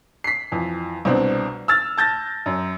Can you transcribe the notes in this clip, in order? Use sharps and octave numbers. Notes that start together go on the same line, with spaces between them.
B6 C7
F2 E3
C2 B2 C4 D4
E6 F6 A6
A5 G6 A6 A#6
F#2